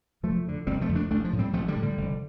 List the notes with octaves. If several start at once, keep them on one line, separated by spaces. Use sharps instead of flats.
F1 F3 A3
F2 D3
F1 G3 C4
F3 A3
F2 D3
A3 D4
A1 A3 D4
F3
A2
G3 C4
A1 F3 A3
D3 G3
A2
D3 G3
F1